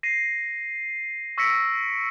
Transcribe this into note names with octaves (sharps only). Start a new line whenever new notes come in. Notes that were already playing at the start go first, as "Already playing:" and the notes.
A#6 C7 D#7
C#6 E6 A#6 B6 C#7 D7